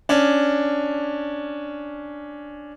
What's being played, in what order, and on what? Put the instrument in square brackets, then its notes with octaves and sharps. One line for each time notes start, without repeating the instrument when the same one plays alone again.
[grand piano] C#4 D4